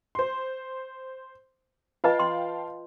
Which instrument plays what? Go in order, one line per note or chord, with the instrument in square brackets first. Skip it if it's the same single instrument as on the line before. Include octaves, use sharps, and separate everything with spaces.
[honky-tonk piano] C5 C6
[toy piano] F4 B4 D#5 [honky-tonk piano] F5 G5 A5
[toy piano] C6